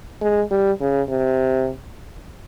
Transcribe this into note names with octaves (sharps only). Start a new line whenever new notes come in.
G#3
G3
C#3
C3